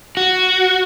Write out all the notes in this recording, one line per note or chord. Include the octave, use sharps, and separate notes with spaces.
F#4